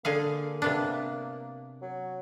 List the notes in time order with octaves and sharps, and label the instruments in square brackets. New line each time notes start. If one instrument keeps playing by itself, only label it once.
[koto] D3 G#4 F5 [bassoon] A#3
[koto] C3 B3 D4
[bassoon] F#3